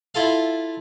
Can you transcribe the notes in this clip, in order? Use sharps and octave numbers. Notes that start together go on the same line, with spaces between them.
E4 F4 A4 F5